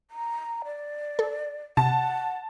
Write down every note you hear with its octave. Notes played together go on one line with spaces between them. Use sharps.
A#5
D5
A4
C3 F#5 A5